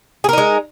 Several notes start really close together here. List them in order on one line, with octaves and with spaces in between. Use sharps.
G#4 A#4 D#4 G#3